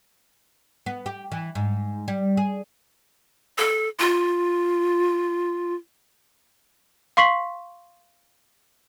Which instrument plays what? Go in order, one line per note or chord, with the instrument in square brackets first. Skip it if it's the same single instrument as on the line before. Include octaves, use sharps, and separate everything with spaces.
[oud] B3
G4
E3
G#2
G3
G#4
[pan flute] A4
F4
[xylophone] F5 C6 C#6 B6 C7 F#7